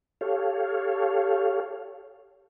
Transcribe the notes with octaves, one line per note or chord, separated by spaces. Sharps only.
G4 A4 C#5 F5